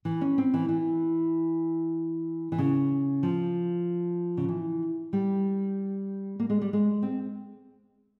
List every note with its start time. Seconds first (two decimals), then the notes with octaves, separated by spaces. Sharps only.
0.05 E3
0.21 C#4
0.38 C4
0.54 E3
0.69 E3
2.52 E3
2.58 C#3
3.23 F3
4.37 C#3
4.49 E3
5.13 G3
6.40 A#3
6.50 G#3
6.62 G3
6.73 G#3
7.02 C4